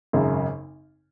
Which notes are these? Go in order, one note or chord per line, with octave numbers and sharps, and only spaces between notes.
G#1 F#2 C#3